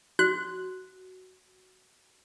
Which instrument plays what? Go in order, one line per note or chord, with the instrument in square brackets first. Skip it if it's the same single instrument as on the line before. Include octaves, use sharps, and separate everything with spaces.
[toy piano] F#4 [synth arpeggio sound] F#6